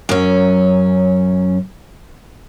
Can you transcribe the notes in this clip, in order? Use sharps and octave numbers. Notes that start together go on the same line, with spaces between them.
F#2 C#4